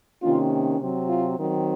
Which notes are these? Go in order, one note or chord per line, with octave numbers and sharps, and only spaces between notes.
C3 D#3 A#3 C#4 F4
C3 F#3 C4
F4
D#3 F#3 C4